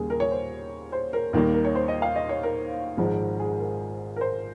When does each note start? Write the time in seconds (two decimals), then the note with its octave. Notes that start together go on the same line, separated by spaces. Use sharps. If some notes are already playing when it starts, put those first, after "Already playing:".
Already playing: D#2 C#3 G3 A#3 G#4
0.10 A#4
0.20 C#5
0.31 C5
0.92 C5
1.13 A#4
1.33 D#2 D#3 G3 A#3 A#4
1.54 A#4
1.65 C#5
1.75 C5
1.88 D#5
2.02 F5
2.16 D#5
2.29 C#5
2.43 A#4
2.97 G#1 G#2 F3 G#3
3.39 G#4
3.60 A#4
4.16 A#4
4.21 C5